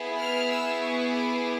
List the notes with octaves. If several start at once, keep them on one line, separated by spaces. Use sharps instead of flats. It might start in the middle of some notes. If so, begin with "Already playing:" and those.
Already playing: B3 E4 G#4
F6
E6
C#6
D6